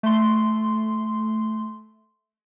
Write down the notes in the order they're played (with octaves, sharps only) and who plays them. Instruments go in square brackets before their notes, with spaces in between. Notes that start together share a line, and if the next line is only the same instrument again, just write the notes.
[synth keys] A3 C6